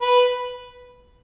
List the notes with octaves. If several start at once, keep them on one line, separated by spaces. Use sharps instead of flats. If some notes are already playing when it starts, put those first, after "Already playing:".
B4